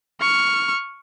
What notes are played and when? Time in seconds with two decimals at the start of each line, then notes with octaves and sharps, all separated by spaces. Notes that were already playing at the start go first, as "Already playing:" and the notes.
0.21 C#6 F6